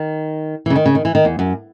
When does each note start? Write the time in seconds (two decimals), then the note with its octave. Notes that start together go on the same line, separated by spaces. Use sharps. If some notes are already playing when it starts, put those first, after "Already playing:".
Already playing: D#3
0.66 E3
0.70 C#3
0.76 D#3
0.86 C#3
0.95 D#3
1.05 E3
1.15 D#3
1.25 E2
1.39 F#2